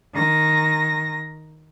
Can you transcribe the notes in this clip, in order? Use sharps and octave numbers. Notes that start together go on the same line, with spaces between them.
D#3 A#6